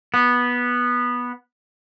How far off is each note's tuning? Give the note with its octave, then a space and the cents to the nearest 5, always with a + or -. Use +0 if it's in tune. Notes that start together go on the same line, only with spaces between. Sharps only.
B3 -10